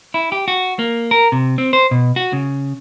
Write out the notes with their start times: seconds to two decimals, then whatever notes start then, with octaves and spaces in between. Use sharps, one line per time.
0.14 E4
0.32 G4
0.48 F#4
0.79 A#3
1.11 A#4
1.32 C3
1.58 C4
1.73 C5
1.91 B2
2.16 F#4
2.33 C#3